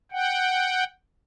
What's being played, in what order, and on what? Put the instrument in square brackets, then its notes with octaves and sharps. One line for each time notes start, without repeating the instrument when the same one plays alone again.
[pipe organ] F#5 G5